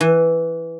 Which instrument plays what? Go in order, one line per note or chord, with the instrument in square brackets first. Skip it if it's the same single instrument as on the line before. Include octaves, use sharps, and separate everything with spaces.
[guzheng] E3